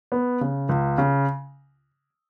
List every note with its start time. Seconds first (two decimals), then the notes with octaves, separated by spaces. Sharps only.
0.12 B3
0.41 C#3
0.69 C#2
0.98 C#3